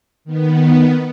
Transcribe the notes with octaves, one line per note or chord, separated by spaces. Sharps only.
D#3 B3